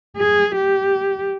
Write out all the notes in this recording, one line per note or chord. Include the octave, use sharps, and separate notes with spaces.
G#4
G4